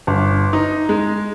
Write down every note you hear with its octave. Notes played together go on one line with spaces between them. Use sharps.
G1
D#4
G#3